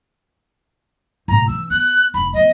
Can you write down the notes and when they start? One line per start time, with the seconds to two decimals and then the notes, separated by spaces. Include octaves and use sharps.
1.28 A2 C3 A#5
1.47 E3 C#4 E6
1.70 B3 F#6
2.14 F1 B5
2.33 F2 B3 D#5